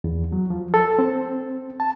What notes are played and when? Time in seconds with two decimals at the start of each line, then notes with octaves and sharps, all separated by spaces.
0.04 E2
0.32 F#3
0.50 F3
0.74 A4
0.99 C4
1.80 A5